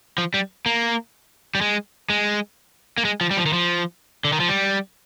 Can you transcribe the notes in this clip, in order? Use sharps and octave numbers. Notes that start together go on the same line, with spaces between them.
F3
G3
A#3
G3
G#3
G#3
A#3
G#3
F3
G3
F3
D#3
F3
D3
D#3
F3
G3